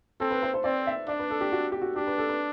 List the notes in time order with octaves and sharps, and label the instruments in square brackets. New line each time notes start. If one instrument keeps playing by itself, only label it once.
[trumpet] C4 [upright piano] A4
[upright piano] B4
C5
C5
[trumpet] C4 [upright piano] D5
[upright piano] E5
[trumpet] D4 [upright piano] D5
[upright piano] B4
A4
G4
F#4
G4
F#4
[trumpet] D4 [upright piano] G4
[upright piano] B4
A4
B4